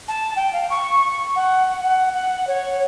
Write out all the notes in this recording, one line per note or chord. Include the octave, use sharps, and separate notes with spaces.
A5
G5
F5
C#6
F#5
F#5
F#5
C#5